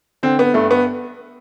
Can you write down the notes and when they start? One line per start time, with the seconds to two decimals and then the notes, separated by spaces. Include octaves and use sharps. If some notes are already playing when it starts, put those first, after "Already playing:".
0.23 D3 C4
0.39 B3
0.54 G2 A3
0.71 B3